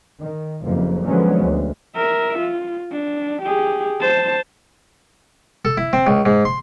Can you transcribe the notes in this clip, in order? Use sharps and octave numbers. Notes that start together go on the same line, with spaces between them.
D#3
F#1 F2 F3 A#3
D3 F3 F#3 G#3 B3 C#4
D2
A#4 E5
F4
D4
G4 G#4
C5 A5
A4
E4
C4
C#2
G#2
C6